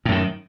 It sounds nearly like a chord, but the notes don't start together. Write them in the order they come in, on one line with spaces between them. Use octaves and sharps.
A2 F#2 D#3